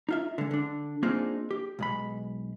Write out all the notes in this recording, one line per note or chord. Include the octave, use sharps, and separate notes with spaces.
D#4 F4 E5
D3 G#3
D3 D4
A#3 C4 D4 D#4 F4 G#4
G4
B1 G#3 B5